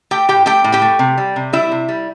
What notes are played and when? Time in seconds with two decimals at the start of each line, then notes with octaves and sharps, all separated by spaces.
0.11 A3 G4 G5
0.28 A2 G4 G5
0.46 A3 G4 G5
0.64 A2
0.72 G4 G5
0.82 A3
0.99 C3
1.18 G3
1.36 C3
1.53 G3 E4 E5
1.72 C3
1.88 G3